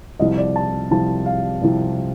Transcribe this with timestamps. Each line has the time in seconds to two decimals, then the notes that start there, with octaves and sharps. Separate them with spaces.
0.19 C2 C3 F3 D#5
0.38 D5
0.56 A5
0.91 C2 C3 F3 A5
1.26 F5
1.62 C2 C3 F3